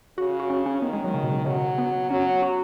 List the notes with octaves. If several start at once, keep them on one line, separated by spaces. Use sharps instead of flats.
C#3 F#4
F#4
C#4
C#4
D#3 B3
G#3
F#3
C#3
B2
C#3
C#3 F#3
B3
F#3 C#4
F#4